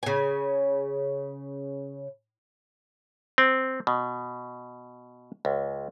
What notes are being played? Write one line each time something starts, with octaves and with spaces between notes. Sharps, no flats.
C#3 G#5
C4
B2
C#2